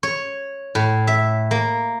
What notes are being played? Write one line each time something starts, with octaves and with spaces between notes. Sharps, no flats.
C#5
A2
E5
A#3